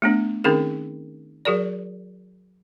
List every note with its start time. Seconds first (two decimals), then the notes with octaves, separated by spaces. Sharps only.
0.02 A3 B3 D4
0.44 D#3 C4 C#4 D#4 G#4 A#4
1.45 F#3 F#4 G#4 A#4 D5